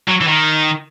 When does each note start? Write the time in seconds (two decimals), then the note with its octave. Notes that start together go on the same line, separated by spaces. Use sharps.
0.08 F#3
0.21 E3
0.28 D#3